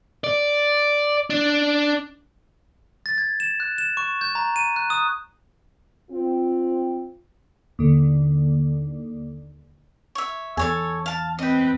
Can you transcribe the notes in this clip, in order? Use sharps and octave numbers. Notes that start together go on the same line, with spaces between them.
D5
D4
A6
G#6
E7
F#6
E7
C#6
G6
A#5
D#7
F#6
D#6
C4 F4
D#2 D3
C#5 E5
E2 A4 C#5 G#5
F5 A5
C4 B4 D#5 G5